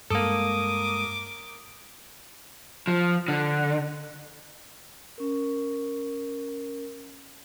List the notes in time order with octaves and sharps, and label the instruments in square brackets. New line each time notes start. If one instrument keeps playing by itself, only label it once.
[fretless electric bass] G2 G#3 [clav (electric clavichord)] A#3 A4 [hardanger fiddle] A#4 D6 [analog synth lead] D#6
[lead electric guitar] F3
D3
[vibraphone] C#4 A#4